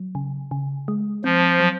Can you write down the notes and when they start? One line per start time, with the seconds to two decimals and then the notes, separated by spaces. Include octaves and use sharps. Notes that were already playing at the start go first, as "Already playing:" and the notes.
Already playing: F#3
0.15 C#3
0.51 C#3
0.88 G#3
1.24 F3 C4
1.60 F#3